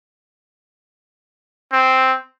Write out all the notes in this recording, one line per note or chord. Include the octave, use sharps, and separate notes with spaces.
C4